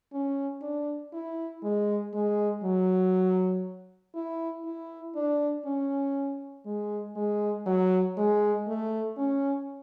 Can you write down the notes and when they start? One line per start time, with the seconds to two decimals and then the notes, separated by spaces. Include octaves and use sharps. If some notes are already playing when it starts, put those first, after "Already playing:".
0.13 C#4
0.62 D4
1.13 E4
1.63 G#3
2.14 G#3
2.63 F#3
4.15 E4
4.65 E4
5.16 D4
5.66 C#4
6.66 G#3
7.16 G#3
7.66 F#3
8.17 G#3
8.68 A3
9.17 C#4